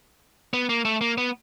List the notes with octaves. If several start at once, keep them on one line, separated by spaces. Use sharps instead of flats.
B3
A#3
A3
A#3
B3